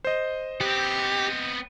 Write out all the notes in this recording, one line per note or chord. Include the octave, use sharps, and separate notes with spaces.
C5 D#5
B3 C4 G4